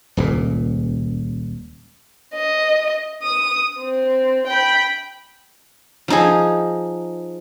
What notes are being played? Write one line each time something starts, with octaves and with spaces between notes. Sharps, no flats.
D#1 C#2 A#2
D#5
D#6
C4
G5 B5
F3 D#4 G#4